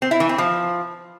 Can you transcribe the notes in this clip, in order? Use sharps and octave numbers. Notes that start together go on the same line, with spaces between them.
C4
E4
E3
C4
F3